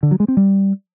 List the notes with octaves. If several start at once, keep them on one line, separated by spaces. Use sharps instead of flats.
D3
F#3
G#3
C4
G3